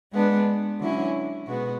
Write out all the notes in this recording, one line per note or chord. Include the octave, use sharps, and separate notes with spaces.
G#3 B3 D4
D3 F#3 C#4 E4
B2 G#3 B3 F#4